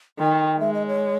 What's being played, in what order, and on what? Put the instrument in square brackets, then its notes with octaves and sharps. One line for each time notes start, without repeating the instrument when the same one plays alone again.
[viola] D#3 [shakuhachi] G5
[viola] G#3 [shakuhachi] E5
[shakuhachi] D#5
C#5